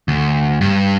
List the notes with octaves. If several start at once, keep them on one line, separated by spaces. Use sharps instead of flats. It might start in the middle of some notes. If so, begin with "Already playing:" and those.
D2
G2